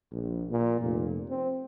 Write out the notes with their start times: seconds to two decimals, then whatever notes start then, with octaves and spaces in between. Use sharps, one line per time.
0.12 A#1
0.51 A#2
0.81 F1
1.29 C4